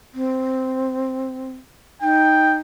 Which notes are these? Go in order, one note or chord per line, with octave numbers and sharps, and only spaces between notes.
C4
D#4 G5